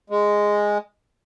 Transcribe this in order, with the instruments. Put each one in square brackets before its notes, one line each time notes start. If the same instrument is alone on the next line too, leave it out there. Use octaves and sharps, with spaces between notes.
[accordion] G#3